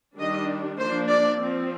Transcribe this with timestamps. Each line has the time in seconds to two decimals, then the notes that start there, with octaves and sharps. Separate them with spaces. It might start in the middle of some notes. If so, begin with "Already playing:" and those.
0.18 D#3 G3 D4 D#5
0.78 F3 A#3 D4 C5
1.08 D5
1.38 F3 C4